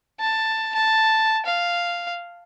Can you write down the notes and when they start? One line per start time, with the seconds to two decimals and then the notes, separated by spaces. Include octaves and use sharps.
0.20 A5
0.75 A5
1.45 F5